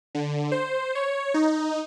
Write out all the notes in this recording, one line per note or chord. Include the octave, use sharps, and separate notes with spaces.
D3
C5
C#5
D#4